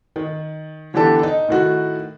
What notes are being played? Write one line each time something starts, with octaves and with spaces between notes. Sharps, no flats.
D#3
D3 E3 B3 D4 G4 A4
D#4
A2 D#3 F#4